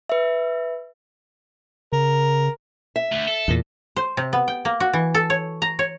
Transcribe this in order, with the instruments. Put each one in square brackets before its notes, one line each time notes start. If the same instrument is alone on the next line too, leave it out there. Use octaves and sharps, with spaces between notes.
[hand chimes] B4 E5
[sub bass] C#3 [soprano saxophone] A#4
[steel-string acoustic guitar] E5
[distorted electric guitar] D2
A4
[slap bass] E2 A#2
[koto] C5
C3
B3
G5
A#3
F#4
E3
A4
C#5
A#5
C#5